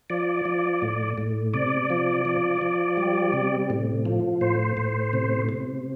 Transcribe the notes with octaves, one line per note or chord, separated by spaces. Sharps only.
F3 D5
F3
A2
A2
C3 D5
F3
F3
F3
G3
C3
A2
F3
A2 C5
A2
C3
C3